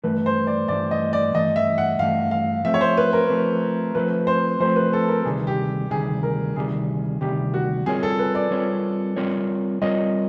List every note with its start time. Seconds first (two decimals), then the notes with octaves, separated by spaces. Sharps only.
0.03 G2 E3 A3 B4
0.26 C5
0.47 D5
0.68 G2 E3 A3 D5
0.91 D#5
1.13 D5
1.34 G2 E3 A3 D#5
1.56 E5
1.78 F#5
1.99 G2 E3 A3 F5
2.31 F5
2.65 F3 A3 C4 E5
2.74 C#5
2.81 C5
2.97 B4
3.13 A#4
3.29 F3 A3 C4
3.95 F3 A3 C4 B4
4.27 C5
4.60 F3 A3 C4 C5
4.76 B4
4.93 A4
5.08 A#4
5.25 D2 C3 D#3 G3 G#4
5.47 G4
5.90 D2 C3 D#3 G3 G#4
6.23 A#4
6.56 D2 C3 D#3 G3 G#4
7.21 D2 C3 D#3 G3 G4
7.54 F#4
7.86 G3 C4 F4 G#4 A#4 C#5
8.03 A4
8.19 B4
8.35 D5
8.51 G3 C4 F4 A#4 C#5
9.16 G3 C4 F4 A#4 C#5
9.82 G3 C4 F4 A#4 C#5 D#5